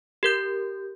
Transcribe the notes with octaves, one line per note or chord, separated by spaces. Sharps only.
G4 A#4 G6